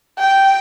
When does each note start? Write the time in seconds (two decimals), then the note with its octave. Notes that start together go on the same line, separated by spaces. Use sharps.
0.19 G5